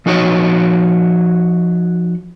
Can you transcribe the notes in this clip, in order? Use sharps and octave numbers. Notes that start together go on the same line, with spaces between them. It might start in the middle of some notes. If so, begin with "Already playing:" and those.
F3 D#4 F#4 C#5